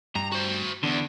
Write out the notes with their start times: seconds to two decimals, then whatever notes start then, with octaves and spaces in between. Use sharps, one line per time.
0.15 G2 A#5
0.32 F#4 C5
0.83 E2 D3 D4